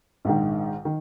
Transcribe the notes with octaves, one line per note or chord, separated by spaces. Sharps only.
A#1 G#2 D#3
D#3